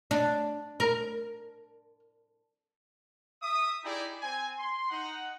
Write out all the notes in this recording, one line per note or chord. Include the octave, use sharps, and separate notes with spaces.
D4
A#4
E5 D#6
D#4 E4 G4 G#4 D5
C4 G#5
C6
D#4 F#5